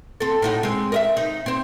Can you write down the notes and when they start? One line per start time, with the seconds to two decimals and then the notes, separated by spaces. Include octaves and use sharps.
0.20 C4 A4
0.42 A2 D#4 F#4
0.63 G#3 C4
0.92 A#4 D#5 E5
1.17 D#4
1.46 C4 C5